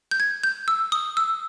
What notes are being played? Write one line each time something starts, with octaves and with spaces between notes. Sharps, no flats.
G6
G#6
G6
E6
D#6
E6